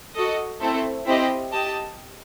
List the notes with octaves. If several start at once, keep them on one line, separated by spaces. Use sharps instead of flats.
F#4 A4 D#5
A3 C4 E4 A4 C5
C4 E4 G4 D#5
G4 D#5 A5